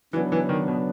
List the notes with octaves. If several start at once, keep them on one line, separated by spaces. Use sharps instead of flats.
C#3 E3 F#3 B3 D4
E3
D#3
B2